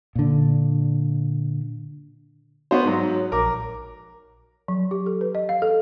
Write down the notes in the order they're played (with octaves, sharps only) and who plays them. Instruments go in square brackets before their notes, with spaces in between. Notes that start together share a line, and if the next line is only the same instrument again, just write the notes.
[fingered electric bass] A#2 D3
[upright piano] B3 C5 [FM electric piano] F#4 C#5
[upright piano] G#2 F#3
[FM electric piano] A#1 D6 [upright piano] A#4
[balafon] F#3
G4
A4
B4
D#5
F5
A4